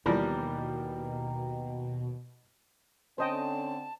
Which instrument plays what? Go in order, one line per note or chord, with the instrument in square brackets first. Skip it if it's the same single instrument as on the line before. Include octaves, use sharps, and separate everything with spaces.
[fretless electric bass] D#2 [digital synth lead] B2 [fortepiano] E3 F3 G3 [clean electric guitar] G4 A#4
[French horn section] D3 C4 [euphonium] C#4 [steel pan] C5 D#5 G5 [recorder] A5